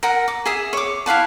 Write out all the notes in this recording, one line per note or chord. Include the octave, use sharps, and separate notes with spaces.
A#4 F#5
D6
G#4 E5 D#6
C#5 D6
E4 F5 F#5 A5